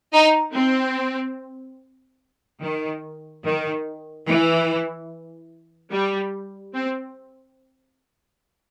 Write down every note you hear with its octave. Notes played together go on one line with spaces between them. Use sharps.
D#4
C4
D#3
D#3
E3
G3
C4